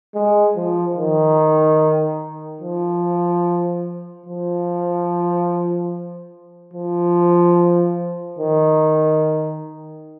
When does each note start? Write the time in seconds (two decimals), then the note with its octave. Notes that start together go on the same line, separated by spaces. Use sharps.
0.15 G#3
0.57 F3
0.97 D#3
2.61 F3
4.26 F3
6.74 F3
8.39 D#3